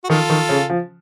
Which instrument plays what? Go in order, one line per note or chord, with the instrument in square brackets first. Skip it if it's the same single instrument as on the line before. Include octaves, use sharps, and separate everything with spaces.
[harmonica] F#4
[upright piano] D#3 [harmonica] F4 A4
[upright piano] D#3
C#3
F3